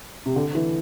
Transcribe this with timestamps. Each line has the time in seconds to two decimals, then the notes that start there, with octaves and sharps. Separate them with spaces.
0.26 C3
0.36 D3
0.55 E3